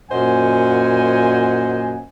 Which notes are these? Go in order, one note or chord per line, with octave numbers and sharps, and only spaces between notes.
F#2 A#2 C5 D#5 F#5 G#5